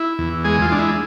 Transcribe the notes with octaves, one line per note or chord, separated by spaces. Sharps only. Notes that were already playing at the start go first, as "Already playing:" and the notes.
Already playing: E4
E2
G#3 G#4
F4
G#3 D4
E4